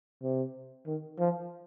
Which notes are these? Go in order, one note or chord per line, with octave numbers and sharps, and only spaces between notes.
C3
D#3
F3